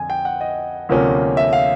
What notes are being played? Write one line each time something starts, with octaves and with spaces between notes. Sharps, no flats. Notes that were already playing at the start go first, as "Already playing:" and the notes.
Already playing: F2 D3 G#5
G5
F#5
D#5
D2 C3 F3 A#3 C#4
E5
F5